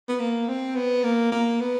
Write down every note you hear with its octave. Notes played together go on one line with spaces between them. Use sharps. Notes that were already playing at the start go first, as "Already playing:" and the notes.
B3
A#3
C4
B3
A#3
A#3
B3